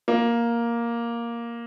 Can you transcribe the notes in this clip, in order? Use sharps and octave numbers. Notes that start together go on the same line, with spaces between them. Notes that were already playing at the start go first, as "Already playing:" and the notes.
A#3